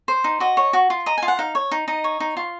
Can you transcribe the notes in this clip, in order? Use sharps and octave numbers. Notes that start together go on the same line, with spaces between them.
C5
D#4
F#4 D#5
C#5
F#4
F4
D#5 A#5
F4 G#5
F#5
D#4 F5
C#5
D#4
D#4 D#5
C#5
D#4
F4